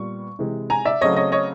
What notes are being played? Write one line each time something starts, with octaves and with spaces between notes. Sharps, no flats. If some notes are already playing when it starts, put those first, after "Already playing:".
Already playing: A#2 G3 B3 C#6
C3 E3 G#3
G#5 A#5
D5 E5
C#3 F#3 A3 C4 C#5 D#5
C#5 D#5
C#5 D#5